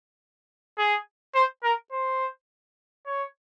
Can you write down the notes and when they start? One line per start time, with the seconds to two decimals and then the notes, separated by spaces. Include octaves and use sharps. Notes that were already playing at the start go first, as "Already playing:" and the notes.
0.78 G#4
1.35 C5
1.64 A#4
1.92 C5
3.06 C#5